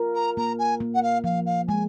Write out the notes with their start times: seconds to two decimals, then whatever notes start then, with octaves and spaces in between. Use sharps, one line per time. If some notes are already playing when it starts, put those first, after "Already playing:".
Already playing: F4 A#4
0.15 A#5
0.37 A#3 A#5
0.59 G#5
0.80 A#3
0.95 F#5
1.03 F5
1.24 F3 F5
1.46 F5
1.68 G#3 G#5